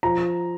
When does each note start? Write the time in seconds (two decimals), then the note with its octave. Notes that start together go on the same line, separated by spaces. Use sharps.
0.03 F3 A#5